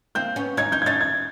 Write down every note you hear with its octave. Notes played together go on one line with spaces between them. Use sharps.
A#3 C4 G6
B3 C#4
C#4 D#4 G#6
C#4 D#4 G6
G#6
C#4 D#4 A6
G#6